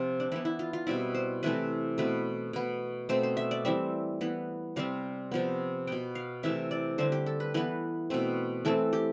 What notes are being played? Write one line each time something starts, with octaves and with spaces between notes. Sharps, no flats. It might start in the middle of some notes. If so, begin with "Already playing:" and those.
Already playing: C3 F3 C4 F4
D4
E3 B3 E4
E4
F4
F4
B2 G3 C4 E4
C5
C3 E3 A3 C4 B4
B2 A3 C4 B4
B2 B3
B2 A3 C4 C5
C5
E5
D5
E3 G3 C4 E5
E3 B3
C3 G3 C4 F5
C3 F3 B3
B2 B3 G5
F5
C3 E3 A3 E5
D5
D3 G3 C4 C5
G4
A4
B4
E3 B3 B4
B2 A3 C4
E3 A3 C4 A4
G4